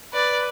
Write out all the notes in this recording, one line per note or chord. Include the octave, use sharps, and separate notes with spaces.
B4 D5